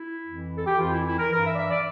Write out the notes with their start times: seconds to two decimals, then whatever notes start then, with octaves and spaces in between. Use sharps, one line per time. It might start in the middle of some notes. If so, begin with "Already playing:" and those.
Already playing: E4
0.27 F2 E3
0.56 A4
0.67 G4
0.79 F2 E3 F4
0.92 E4
1.06 E4
1.18 A#4
1.31 G2 E3 A#4
1.44 E5
1.53 D5
1.58 E5
1.71 D5